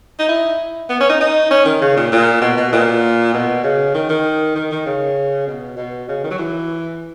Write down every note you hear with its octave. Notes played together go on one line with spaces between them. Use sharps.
D#4
E4
B3
C#4
D#4
D#4
C#4
D#3
C#3
A#2
A#2
B2
B2
A#2
B2
C#3
D#3
D#3
D#3
D#3
C#3
B2
B2
C#3
D#3
F#3
E3